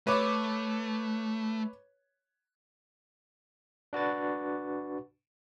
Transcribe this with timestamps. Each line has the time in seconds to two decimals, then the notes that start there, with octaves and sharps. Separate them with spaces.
0.07 A3 B4 C#5 D6
3.93 D4 F#4 B4 A6